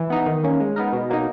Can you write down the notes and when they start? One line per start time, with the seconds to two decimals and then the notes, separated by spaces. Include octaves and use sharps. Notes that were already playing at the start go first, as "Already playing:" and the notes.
Already playing: E3
0.10 B3 D#4
0.26 D#3
0.43 A#3 C#4
0.60 G#3
0.76 B3 D#4 A#4
0.93 B2
1.10 F#3 A#3 D#4